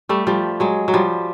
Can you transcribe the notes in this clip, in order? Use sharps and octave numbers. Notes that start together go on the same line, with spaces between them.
G3 A3
F3 G3
F#3 G#3
F#3
F3 G3